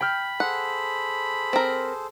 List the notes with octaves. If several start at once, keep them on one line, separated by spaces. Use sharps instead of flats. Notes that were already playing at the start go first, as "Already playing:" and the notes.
G5 B5 F6 G6
G#4 A4 C5 F#5
C4 A#4